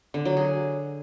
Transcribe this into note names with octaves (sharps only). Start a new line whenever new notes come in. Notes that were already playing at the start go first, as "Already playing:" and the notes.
D3
F#3
G#4